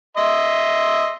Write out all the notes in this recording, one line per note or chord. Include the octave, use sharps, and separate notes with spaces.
D#5 E5 C6